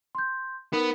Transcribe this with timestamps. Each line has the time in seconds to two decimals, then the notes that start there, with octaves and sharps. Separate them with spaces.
0.15 C6 G6
0.73 B3 D#4 A#4